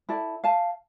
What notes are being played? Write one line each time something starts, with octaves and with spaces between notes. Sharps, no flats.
E4 A4 D5
F5 G#5 A5